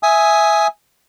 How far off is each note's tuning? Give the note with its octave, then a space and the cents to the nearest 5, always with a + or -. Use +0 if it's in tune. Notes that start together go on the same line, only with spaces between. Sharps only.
E5 +0 G#5 +5 D#6 +15